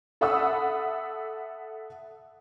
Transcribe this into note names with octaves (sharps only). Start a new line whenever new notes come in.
A4 E5 F#5 B5 D#6 E6